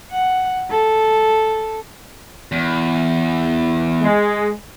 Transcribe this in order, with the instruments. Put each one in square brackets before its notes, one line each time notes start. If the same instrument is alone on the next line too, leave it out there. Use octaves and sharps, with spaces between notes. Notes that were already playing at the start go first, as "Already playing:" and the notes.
[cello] F#5
A4
[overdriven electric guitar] E2
[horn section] G#3